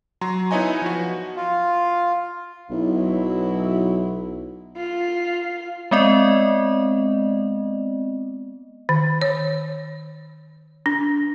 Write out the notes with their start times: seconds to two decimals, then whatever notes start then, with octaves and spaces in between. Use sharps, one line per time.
0.21 F#3 A#5 C6
0.51 B3 D#4 E4 C#5 D#5 G#5
0.82 F3 F#4
1.36 F4
2.71 B1 B2 F#3 E4
4.77 F4
5.91 G#3 B3 C4 D5 D#5
8.89 D#3
9.21 C#5
10.86 D4